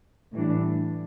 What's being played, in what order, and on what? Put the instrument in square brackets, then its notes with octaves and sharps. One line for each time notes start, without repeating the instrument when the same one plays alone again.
[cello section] A2 E3 G3 D4